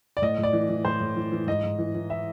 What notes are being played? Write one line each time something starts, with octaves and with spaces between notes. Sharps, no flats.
D5
A2 D#5
A2
D5
E3
E3
A2 C5
A2
E3
E3
G#2 D#5
G#2
E3
E3
E5